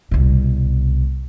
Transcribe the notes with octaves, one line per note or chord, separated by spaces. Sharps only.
C2 B2